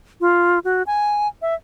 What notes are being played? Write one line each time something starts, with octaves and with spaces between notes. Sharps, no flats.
F4
F#4
G#5
E5